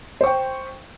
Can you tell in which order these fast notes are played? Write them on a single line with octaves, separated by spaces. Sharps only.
C5 C#6 G5